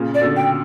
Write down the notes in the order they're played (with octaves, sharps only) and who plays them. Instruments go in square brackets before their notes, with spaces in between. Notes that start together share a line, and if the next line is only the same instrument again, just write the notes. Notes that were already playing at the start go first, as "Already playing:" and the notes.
Already playing: [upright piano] A#2 C#3
[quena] D5
[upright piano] B2 D3
[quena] G5